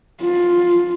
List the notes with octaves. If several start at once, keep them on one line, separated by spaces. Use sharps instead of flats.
F4